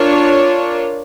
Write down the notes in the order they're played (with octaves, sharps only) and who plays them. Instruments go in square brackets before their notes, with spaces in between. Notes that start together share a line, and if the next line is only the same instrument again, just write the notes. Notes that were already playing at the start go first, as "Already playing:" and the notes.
Already playing: [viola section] D4 F4 A#4 C#5